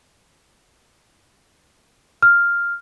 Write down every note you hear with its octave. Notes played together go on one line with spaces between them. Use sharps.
F6